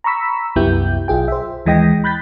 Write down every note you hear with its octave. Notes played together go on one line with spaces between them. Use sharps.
A#5 B5 C#6 E6 B6
C2 F#2 B3 E4 G4 G6
B1 F4 G#4 G5
C5 E5
D#2 E3 G#3 D#5 G5 A#6
B5 F#6 G6 A6 B6